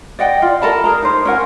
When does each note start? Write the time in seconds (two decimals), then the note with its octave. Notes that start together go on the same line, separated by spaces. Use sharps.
0.19 D5 D#5 F#5 G5
0.42 F4 D5
0.62 A4 A#4 A5 B5
0.84 G#4 A#4 A#5
1.02 D#4 C5
1.25 C#4 A#4 F#5 G#5